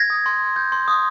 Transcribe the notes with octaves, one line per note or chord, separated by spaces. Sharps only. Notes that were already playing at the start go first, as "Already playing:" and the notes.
Already playing: G#6 A#6
D#6
C6
C6
G6
C6
D#6